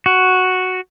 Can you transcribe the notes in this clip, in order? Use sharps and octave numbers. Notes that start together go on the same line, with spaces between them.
F#4